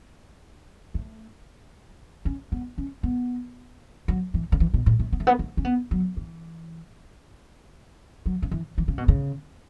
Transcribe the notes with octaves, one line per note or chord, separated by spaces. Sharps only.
A3
C#4
B3
C#4
B3
F#3
E3
C#3
E3
B2
A2
A3
B3
A3
B3
A3
C#4
B3
F#3
E3
F#3
C#3
E3
E3
C#3
B2
C#3